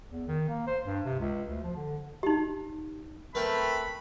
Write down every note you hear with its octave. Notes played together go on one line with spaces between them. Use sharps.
E2
D#3
A#3
C5
G2
C3
C#2
D2
F3
D3
D#4 G4
A3 C4 A#4 B4 B5